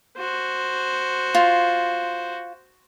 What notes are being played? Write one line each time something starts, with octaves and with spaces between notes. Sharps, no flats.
F#4 C5
F4